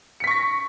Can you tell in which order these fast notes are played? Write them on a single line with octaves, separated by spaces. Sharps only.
C#7 B6 C#6 A#6